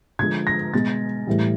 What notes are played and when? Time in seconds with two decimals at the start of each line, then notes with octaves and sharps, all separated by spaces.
0.19 D3 F3 G#3 G#6
0.47 A#6
0.73 B2 G#3 A6
1.27 A2 E3 G3